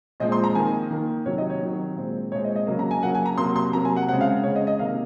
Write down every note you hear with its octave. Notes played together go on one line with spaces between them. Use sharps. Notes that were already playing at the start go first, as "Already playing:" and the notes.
A#2 F3 G#3 C4 D#5
C6
A#5
D#3 A#3 G#5
D#3 A#3
C3 D#3 F#3 C#5
D#5
C#5
C3 D#3 F#3
A#2 G#3 C4
A#2 G#3 C4 C#5
D#5
D#5
C#3 F#3 A#3
A#5
G#5
C#3 F#3 A#3 F#5
G#5
A#5
C3 F#3 A#3 C6
C6
C3 F#3 A#3 A#5
G#5
F#5
C#3 G#3 C4 F#5
F5
C#3 G#3 C4 C#5
D#5
D#5
C3 D#3 A#3 F5